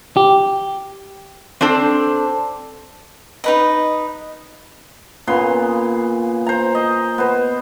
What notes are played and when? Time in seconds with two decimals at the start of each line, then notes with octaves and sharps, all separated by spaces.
0.17 G4
1.61 C4 D4 A4 C5
3.44 D#4 B4 D#5
5.27 A#2 C#3 B3 C6
6.46 C5 A#5
6.75 D#5
7.18 B3 C5